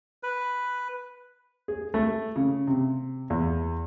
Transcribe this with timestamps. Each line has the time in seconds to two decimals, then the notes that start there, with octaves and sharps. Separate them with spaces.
0.23 B4
1.68 G#4
1.94 A3
2.36 C#3
2.67 C3
3.30 E2